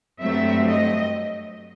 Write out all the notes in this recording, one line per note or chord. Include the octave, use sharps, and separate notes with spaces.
G2 F#3 A3 C4 E5
D#5